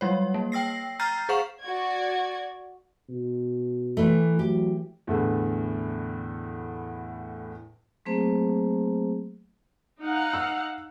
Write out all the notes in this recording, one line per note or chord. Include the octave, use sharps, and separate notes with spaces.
F#3 G3 C#5
A#3
G5 E6 A#6 C7
A#5 F6 G6 A6 C7
G#4 C5 F5 F#5 C#6 E7
F#4 D5 G#6
B2
E3 A3
F#3 G4
E2 A2 D3
F#3 A3 A#3 C4 G#4 C5
D#4 F5 F#5
E6